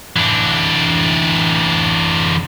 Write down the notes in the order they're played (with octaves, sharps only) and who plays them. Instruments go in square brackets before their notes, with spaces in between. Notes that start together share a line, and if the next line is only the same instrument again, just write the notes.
[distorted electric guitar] E3 D4